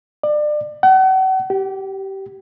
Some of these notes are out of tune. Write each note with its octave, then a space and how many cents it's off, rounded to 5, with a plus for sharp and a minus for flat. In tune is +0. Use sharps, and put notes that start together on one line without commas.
D5 +30
F#5 +40
G4 -20